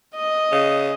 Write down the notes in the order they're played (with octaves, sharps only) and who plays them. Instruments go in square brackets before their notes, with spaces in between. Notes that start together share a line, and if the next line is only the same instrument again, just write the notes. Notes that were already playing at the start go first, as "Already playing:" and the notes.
[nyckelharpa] D#5
[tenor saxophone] C#3